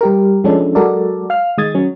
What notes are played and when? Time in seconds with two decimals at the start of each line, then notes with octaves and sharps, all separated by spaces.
0.01 G3 G4 A#4
0.44 F3 G#3 C#4 D4 A4
0.75 F#3 G#3 F#4 A4 A#4 D5
1.30 F5 F6
1.58 D#3 G#3 D#6 G#6 A6
1.75 F#3 C#4